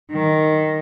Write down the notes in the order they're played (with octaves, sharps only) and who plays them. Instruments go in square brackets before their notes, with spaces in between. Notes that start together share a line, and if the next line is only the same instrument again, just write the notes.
[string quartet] D#3